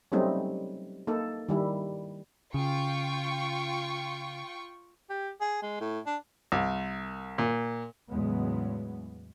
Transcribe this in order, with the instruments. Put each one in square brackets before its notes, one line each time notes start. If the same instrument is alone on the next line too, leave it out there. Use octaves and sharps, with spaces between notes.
[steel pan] F#3 G3 A3 C4 C#4 D#4
A#3 D#4 A4
D#3 G3 E4
[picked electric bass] C#3 [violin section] F4 G5 C#6
[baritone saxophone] G4
G#4
G#3
A2
D4
[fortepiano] C2
A#2
[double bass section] E2 A2 C#3 F#3 G#3 B3